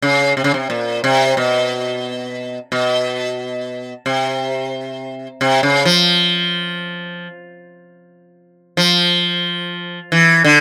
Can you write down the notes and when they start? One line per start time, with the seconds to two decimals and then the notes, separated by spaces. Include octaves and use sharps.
0.02 C#3
0.37 C3
0.44 C#3
0.54 C3
0.70 A#2
1.04 C3
1.37 B2
2.72 B2
4.06 C3
5.41 C3
5.63 C#3
5.85 F3
8.77 F3
10.12 E3
10.44 D3